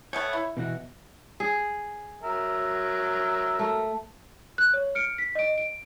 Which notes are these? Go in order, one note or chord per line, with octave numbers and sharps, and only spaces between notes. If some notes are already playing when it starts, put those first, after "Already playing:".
A3 B3 C#5 G5
E4
B2 E3 F#4
G#4
F#3 A#4 E5
A3
F#6
C#5
F6 C#7 D7
B6
D#5 D7
D7